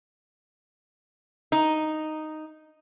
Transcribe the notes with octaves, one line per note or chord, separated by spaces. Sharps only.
D#4